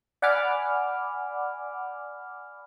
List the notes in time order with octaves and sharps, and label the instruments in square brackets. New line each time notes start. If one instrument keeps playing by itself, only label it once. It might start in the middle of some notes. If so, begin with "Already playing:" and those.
[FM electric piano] D5 F#5 G#5 B5 D6 F6